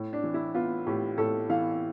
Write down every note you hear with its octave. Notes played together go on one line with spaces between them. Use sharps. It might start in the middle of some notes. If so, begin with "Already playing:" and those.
Already playing: A2
D4
E3
E4
B3 F4
A2 G4
A2 A4
E3 F5